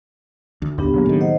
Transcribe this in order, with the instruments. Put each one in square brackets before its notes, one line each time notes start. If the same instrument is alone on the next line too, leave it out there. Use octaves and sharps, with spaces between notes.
[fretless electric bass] D2
[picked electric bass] A1 D#2 [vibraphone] B3 D4 G4
[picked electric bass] C#3 F#3 A#3
[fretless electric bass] A2 D#3
[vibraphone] C5 D#5 F#5